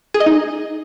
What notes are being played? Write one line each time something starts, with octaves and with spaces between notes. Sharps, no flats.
G#4
D#5
D#4